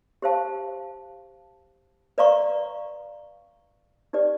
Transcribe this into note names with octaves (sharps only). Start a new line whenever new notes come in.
G4 C5 F5 A5
B4 D5 F5 A#5 C#6
D#4 G4 B4 D5